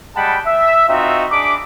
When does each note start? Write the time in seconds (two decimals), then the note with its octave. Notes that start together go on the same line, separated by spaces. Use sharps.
0.15 G3 G#3 F#5 G5 A5 B5
0.45 E5
0.88 C4 D#4 F4 F#4 E5
1.31 D4 G#4 B5 D6